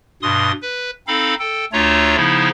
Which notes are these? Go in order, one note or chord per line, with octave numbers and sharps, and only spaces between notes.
G2 B2 C6 D#6
B4
C4 D#4 A4 F5 B5
A4 G5
D2 A3 D4 F4 C#5 A#5
C#3 F3 B3 D#4 E4